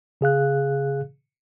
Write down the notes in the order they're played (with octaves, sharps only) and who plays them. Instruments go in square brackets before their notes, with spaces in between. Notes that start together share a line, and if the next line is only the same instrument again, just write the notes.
[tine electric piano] C#3 G#4 F5 F#6